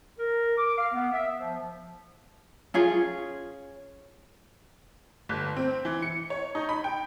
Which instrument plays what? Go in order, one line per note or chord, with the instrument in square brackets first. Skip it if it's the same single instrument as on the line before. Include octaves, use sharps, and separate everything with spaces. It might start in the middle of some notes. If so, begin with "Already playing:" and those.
[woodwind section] A#4
D6
F5
B3
E5
F3
[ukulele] C#4 F4 G#4
[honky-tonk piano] G1
C4
E3
C#7
C#5
D#4
B5
G5